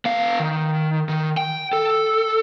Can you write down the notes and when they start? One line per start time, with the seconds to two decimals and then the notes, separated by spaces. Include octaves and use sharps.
0.05 B3 F5
0.40 D#3
1.09 D#3
1.37 G5
1.73 A4